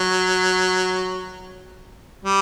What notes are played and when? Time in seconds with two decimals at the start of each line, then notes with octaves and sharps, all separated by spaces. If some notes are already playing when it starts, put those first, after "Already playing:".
Already playing: F#3
2.25 G3